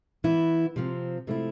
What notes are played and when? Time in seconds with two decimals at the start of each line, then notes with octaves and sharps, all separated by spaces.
0.24 E3 B3 E4
0.76 C3 F3 C4
1.27 C3 F3 A3 E4